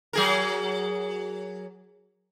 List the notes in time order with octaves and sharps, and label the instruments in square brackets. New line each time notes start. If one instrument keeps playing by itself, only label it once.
[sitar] F#3 G#4 A#4